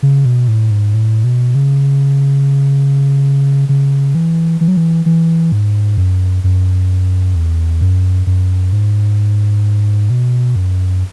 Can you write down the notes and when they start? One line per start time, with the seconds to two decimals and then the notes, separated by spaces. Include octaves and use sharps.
0.03 C#3
0.25 B2
0.48 A2
0.71 G#2
0.94 A2
1.24 B2
1.55 C#3
3.69 C#3
4.15 E3
4.61 E3
4.68 F#3
4.77 E3
5.06 E3
5.52 G#2
5.97 F#2
6.44 F#2
7.35 E2
7.81 F#2
8.27 F#2
8.72 G#2
10.10 B2
10.56 F#2